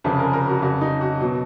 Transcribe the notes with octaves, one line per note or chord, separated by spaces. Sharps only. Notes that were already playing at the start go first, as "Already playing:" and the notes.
F1 F2 C#3 F3 G#4
A#4
A#4
F#4
F2 C#3 F#3 F#4
D#4
F#4
B2 F#3